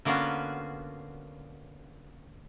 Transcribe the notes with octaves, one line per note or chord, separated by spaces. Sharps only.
D3 A#3 B3 C#4 F4 F#4